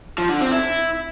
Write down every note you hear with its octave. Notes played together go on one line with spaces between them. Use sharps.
F3
D3
C4
E4